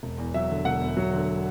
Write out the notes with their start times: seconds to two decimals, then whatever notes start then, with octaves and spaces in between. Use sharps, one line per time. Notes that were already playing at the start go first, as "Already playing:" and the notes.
0.03 E1
0.18 E2
0.34 F#3 E5
0.50 D3
0.65 E1 F#5
0.81 E2
0.97 F#3
1.13 D3